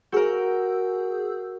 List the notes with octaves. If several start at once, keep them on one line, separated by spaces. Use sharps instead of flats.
F#4 G#4 A#4 E6 G6